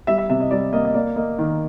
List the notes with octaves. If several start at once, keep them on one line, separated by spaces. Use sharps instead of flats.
G3 E5
E5
C3 E5
D#5
G3 D5
A#3 D#5
D#5
A#3 D5
A#3 D#5
D#3